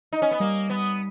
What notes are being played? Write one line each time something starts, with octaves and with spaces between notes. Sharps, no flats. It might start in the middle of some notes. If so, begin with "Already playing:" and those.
D#4
C#4
B3
G3 A#3
B3